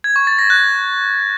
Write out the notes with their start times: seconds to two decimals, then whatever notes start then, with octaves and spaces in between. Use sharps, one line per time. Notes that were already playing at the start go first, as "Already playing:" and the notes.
0.04 G#6
0.16 C#6
0.27 A6
0.39 A#6
0.50 F#6